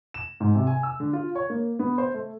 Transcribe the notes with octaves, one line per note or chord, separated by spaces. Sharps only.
E7
G#2
C3
G#5
E6
D3
F4
C#5
A#3
B3
C5
A3